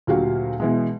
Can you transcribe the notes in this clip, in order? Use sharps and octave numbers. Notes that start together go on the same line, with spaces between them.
D2 A#2 F#3 F#4 G4 F5
B2 E3 G#3